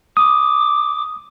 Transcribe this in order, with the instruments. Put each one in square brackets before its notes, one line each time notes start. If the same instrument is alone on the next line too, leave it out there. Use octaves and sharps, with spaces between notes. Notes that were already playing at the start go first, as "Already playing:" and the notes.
[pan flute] D6 [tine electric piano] D#6